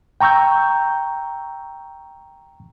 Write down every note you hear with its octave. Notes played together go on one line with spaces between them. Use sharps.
G5 A#5 C#6 E6 G6